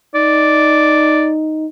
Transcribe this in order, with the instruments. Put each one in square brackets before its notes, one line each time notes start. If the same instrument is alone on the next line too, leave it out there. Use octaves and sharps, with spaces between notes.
[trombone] D#4 [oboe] D5